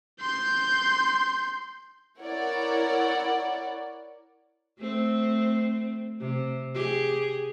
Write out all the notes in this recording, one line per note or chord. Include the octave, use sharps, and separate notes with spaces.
C6 G6
E4 A#4 C#5 D5 F#5
A3 C4
C3
G4 G#4